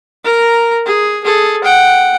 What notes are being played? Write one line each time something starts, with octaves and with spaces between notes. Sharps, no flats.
A#4 A#5
G#4
G#4 A4
F#5 G5